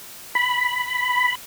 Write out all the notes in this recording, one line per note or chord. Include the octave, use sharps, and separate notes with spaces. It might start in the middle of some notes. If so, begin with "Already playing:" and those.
B5